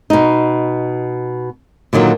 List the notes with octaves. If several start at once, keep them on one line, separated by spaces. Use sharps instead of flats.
B2 D#4
A#2 D3 D#3 F#3